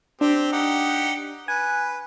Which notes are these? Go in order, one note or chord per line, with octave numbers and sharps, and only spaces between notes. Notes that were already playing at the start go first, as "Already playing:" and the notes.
C4 D4 G4
D#4 G4 F#5
B4 G#5